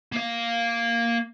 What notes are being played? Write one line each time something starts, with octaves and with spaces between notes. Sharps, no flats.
A#3 F5